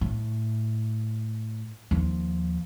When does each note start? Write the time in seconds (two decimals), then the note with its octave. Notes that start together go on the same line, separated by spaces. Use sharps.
0.01 A2
1.91 D#2 F3